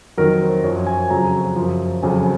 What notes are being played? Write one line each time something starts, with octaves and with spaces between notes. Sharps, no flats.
F2 D#3 F#3 A#4
C5
F#2 F3 C#5
G#5
F2 C#3 F#3 A#5
F#2 F3
F2 C#3 F#3 G#5